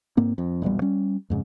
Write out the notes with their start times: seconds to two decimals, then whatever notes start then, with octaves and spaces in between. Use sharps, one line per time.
0.17 G#2 A#3 C4
0.38 F2
0.62 E1 A#1 B2 G3
0.82 G3 C#4
1.30 F2 G#2 C#3